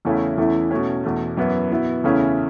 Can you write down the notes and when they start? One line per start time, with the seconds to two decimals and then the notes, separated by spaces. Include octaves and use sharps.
0.05 E2 C#3 A3 C#4 E4
0.37 E2 E3 A3 C#4 E4
0.71 B2 A3 C#4
1.04 E2 B2 A3
1.37 F#2 E3 B3 E4
1.71 B2 B3 E4
2.04 E2 C#3 A3 C#4 E4